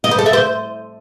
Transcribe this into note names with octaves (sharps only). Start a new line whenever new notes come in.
D#5
C5
A4
E5
C5